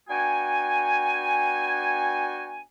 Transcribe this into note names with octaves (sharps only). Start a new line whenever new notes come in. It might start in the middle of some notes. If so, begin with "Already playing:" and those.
B3 D4 F#4 G5 G#5